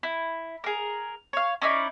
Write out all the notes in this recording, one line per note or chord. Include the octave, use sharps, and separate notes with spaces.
E4
G#4 A#4
C#5 F5
C#4 D#4 E4 D5